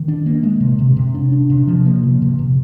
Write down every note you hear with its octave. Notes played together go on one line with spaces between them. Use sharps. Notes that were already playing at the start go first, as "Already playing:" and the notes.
Already playing: D#3
D4
A#3
G#3
C3
C3
C3
D4
D4
C3
F3
A#3
C3
C3
C3